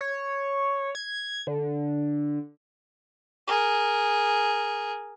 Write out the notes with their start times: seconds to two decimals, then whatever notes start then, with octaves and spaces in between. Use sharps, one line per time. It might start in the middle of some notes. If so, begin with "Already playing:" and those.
0.01 C#5
0.95 G#6
1.47 D3
3.47 G#4 A#4